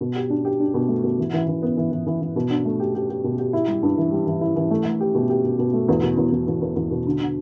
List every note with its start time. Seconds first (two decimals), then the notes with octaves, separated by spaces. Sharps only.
0.01 B2
0.15 G4
0.30 D4
0.45 G4
0.60 D4
0.74 B2
0.88 A3
1.04 B2
1.18 E3
1.33 E3
1.48 E3
1.62 B3
1.77 E3
1.91 E3
2.06 E3
2.21 E3
2.36 B2
2.50 D4
2.65 A3
2.80 G4
2.95 G4
3.09 G4
3.24 B2
3.38 G4
3.53 E4
3.68 G3
3.83 G2
3.98 E3
4.12 G3
4.27 E3
4.41 E4
4.56 E3
4.71 A3
4.85 A3
5.00 G4
5.15 B2
5.30 G4
5.44 B2
5.59 B2
5.73 A3
5.89 E2
6.03 B2
6.17 E2
6.32 E2
6.47 E2
6.61 E2
6.76 E2
6.91 B2
7.06 D3
7.20 D3